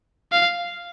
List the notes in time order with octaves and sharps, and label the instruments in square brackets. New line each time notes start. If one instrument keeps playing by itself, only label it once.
[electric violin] F5